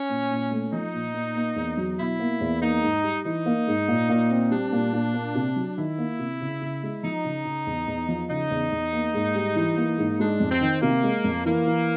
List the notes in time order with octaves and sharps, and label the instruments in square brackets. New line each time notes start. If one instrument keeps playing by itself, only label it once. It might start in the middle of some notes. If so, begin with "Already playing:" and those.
Already playing: [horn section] C#4
[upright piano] A#2
A#2
A3
[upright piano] F3 [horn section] D#4
[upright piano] A#2
A#2
A#3
E2
F#3
[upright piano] B2 [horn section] E4
[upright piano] A#3
E2
[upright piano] A#3 [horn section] D#4
[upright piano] G#2
G3
[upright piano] E3 [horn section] D#4
[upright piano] A#3
G#2
A#2
A#2
C4
[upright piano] G3 [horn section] D4
[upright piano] A#2
A#2
A#3
C3
F#3
[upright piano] D#3 [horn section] E4
[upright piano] A#3
C3
C#3
C#3
G#3
[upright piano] F3 [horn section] D#4
[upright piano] C#3
C#3
E2
E2
F3
[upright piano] C#3 [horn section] D#4
[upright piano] E2
E2
A#3
G#2
G3
E3
A#3
G#2
[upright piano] G#3 [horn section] D4
[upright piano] F2
[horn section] C4
[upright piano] D#3
[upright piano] C3 [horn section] A#3
[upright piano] G#3
F2
[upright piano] E3 [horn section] A#3
[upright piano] E3